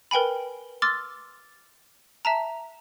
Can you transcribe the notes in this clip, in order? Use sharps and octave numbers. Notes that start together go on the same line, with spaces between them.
A#4 B4 G5 G#5 B5
C6 D6 E6 F6 A6
E5 A5 A#5